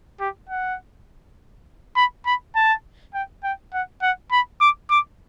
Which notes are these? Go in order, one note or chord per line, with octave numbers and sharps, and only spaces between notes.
G4
F#5
B5
B5
A5
G5
G5
F#5
F#5
B5
D6
D6